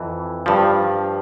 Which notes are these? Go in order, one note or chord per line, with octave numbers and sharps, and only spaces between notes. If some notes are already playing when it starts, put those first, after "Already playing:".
Already playing: F2 E3
G2 F3